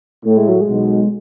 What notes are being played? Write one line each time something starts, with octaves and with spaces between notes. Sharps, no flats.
A2 A3
G#3
F#3
G#3
B1 B2